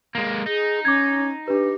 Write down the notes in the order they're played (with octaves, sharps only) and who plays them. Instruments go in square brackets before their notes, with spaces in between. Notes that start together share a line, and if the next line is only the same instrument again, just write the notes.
[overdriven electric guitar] G#3 A#3
[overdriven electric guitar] D#4 [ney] G#4
[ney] C#4 [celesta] D6 G#6
[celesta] D4 B4 [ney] G4